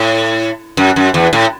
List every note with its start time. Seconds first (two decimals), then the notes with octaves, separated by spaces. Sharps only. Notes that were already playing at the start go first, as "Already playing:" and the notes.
Already playing: A2
0.77 F#2
0.96 F#2
1.14 E2
1.33 A2